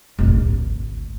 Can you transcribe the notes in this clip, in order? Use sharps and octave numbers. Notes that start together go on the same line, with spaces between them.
F1 A#1
G#1 D2